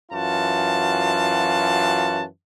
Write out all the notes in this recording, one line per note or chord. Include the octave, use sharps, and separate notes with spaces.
F#2 E3 F4 F#4 A5